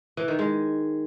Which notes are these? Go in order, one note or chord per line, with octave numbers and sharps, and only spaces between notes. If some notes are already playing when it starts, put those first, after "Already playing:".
E3
D#3
G#3